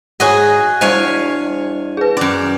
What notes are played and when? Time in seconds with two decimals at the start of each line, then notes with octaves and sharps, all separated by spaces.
0.20 G#2 F#4 G#4 C#5 D#5 F#5 G#5
0.81 E2 G3 D4 C5 C#5 D#5 F5 G#5
1.97 G#4 B4
2.17 F#2 C#4 D5